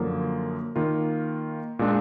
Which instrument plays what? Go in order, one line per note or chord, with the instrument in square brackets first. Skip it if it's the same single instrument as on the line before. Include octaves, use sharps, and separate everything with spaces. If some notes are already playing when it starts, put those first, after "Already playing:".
Already playing: [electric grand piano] F#2 D3 F3 A#3
D#3 A#3 F4
A#2 G#3 D4